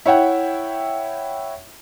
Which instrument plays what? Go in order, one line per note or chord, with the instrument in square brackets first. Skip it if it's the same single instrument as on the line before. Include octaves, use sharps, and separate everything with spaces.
[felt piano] E4 C#5 E5 F#5 G5